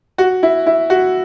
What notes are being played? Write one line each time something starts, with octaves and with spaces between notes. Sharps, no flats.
F#4
E4
E4
F#4